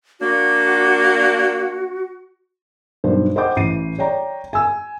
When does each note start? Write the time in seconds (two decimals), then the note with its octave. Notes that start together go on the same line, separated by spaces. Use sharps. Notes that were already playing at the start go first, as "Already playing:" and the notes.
0.20 A#3 D4 F#4
3.04 B1 G2 C5
3.36 C5 D#5 F#5 G5 D6 G6
3.56 A1 E3 C7 D#7
3.99 C#5 D5 G5 A#5
4.53 G#5 E6